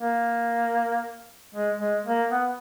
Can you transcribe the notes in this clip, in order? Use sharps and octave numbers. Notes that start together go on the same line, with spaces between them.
A#3
G#3
G#3
A#3
B3